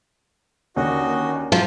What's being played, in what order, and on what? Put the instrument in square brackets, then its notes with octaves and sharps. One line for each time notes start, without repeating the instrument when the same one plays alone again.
[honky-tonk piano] D#2 D3 [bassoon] C#4 [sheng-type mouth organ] F#4 D#5
[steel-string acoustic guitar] F3 F4 [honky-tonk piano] F#3